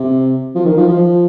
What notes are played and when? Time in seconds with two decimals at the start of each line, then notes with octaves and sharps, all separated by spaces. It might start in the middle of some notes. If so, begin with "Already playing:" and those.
Already playing: C3
0.55 F3
0.65 D#3
0.77 F3
0.88 F3